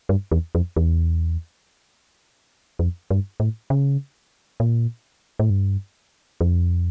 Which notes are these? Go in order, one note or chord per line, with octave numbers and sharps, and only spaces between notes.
G2
E2
F2
E2
F2
G2
A2
C#3
A#2
A2
G2
F2